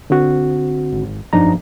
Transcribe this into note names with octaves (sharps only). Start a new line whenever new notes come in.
D3 C4 F#4
G#1
F1 G2 F3 D4 D#4 A#5